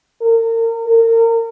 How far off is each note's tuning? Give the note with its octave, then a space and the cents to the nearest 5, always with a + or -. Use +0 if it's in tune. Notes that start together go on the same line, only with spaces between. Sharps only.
A#4 -35
A#4 -35